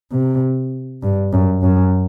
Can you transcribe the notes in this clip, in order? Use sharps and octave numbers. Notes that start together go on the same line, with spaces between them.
C3
G2
F#2
F#2